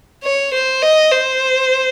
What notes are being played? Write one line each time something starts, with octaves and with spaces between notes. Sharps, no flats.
C#5
C5
D#5
C5